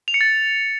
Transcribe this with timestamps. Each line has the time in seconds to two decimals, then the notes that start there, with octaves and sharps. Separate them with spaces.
0.08 F7
0.14 C#7
0.21 A6